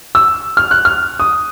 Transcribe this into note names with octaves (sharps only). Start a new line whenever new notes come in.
E6
F6
F#6
F6
D#6